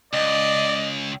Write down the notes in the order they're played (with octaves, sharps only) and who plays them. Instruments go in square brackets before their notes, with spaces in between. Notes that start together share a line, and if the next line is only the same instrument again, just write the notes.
[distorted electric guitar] C#2 [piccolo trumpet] D5 [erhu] D#5